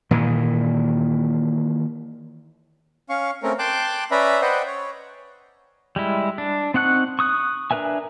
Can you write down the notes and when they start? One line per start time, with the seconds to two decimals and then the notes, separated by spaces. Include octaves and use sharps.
0.11 A#2 D#3 E3
3.09 C#4 F5 C#6
3.43 A3 C4 C#4 A#4
3.59 G5 A5 C6 D6 F#6
4.11 C#4 B4 D5 E5 A#5 B5
4.41 B4 C5 D5 D#5 F#5 G5
4.66 C#5
5.96 G3 G#3 E4
6.38 D4
6.74 C4 D#4 F#5 C#6 F#6
7.19 C#6 D#6 F#6
7.71 D4 A#4 B4 E5 G#5